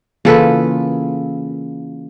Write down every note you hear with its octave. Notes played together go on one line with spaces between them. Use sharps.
C#3 E3 A#3 F4 A4 B4